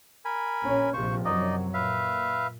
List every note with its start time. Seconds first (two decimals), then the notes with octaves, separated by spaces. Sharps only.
0.25 A#4 G#5 B5
0.63 A#1 C#4
0.94 A#1 C3 F3 C5 C#6
1.25 F#2 C3 F#3 D#4 D5 D#5
1.74 A#2 B4 E5 F5